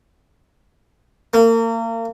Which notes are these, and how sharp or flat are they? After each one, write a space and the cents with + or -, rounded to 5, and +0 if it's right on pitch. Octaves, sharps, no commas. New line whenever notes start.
A#3 -35